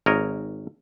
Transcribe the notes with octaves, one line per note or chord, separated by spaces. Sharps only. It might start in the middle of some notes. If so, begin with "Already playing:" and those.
G#1 A#4 C#5 D#5